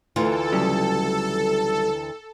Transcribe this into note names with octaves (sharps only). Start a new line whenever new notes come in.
D2 E3 F4 A4
C#3 F#3 G3